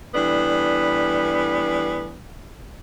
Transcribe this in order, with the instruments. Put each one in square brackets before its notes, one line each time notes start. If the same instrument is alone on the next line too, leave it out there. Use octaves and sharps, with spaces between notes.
[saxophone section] E3 G3 A3 B3 D4